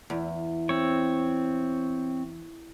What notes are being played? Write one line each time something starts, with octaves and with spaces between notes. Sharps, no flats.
E2
C4 C#5